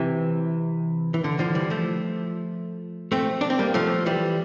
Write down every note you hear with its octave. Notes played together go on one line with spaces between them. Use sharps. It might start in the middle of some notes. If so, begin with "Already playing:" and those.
Already playing: C3 E3
E3
D3
D3 F3
E3 G3
F3 A3
A3 C4
D4
C4
G3 A#3
F3 A3
E3 G3